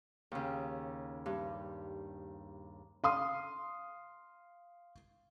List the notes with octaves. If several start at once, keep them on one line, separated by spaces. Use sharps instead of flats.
D#2 C#3
G2
F5 C6 D#6